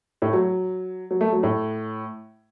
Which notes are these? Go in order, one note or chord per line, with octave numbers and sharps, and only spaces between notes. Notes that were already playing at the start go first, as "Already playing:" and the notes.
A2
F#3
F#3
A3
F#3
A2